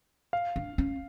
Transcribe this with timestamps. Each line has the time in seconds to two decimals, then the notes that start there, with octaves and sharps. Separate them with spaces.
0.33 F5
0.56 D4
0.78 C#4